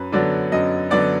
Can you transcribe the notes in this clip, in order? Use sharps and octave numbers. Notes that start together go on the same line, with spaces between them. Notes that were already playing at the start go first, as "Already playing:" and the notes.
Already playing: F#2 B4
D3 F#3 B3 D5
F#2 D#5
D3 F#3 B3 D5